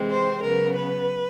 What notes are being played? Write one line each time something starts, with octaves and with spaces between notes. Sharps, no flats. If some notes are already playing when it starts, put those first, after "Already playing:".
Already playing: C3 E3 G#3 C4
C5
C#3 F#3 B3 A#4
B4